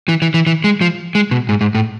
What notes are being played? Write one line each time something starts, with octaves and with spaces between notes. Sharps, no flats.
E3
E3
E3
E3
G#3
F3
G#3
B2
G#2
G#2
A2